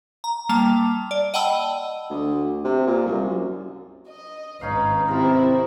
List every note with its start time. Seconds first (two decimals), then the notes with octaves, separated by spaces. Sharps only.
0.24 A#5
0.49 G3 A#3 A5 F7
1.11 D5
1.34 D#5 F#5 G5 A5 B5 E6
2.10 D2
2.64 C3
2.87 A#2
3.06 C2
3.24 F#2
4.10 D#5
4.61 G#1 C#4 D#4 B4 F5
5.08 C3 C4 E4 F4 A#4